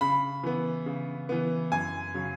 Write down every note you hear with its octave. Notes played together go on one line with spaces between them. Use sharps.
C#3 B5
E3 B3
C#3
E3 B3
F#2 G#5
C#3 F#3